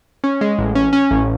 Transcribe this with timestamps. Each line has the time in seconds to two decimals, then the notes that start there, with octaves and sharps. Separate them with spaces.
0.24 C#4
0.41 G#3
0.59 A1
0.75 C#4
0.93 C#4
1.11 A1